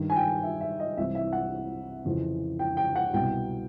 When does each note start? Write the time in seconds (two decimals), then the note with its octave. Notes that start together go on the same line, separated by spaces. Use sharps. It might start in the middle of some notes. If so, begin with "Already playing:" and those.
Already playing: G2 D#3
0.10 G#5
0.16 G5
0.43 E5
0.61 E5
0.80 D#5
0.97 C2 C3 E3 E5
1.15 E5
1.32 F#5
2.05 F2 C#3 E3
2.59 G5
2.77 G5
2.96 F#5
3.13 C2 B2 G5